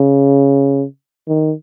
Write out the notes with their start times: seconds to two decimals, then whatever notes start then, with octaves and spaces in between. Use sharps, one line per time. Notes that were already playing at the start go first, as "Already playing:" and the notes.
Already playing: C#3
1.28 D#3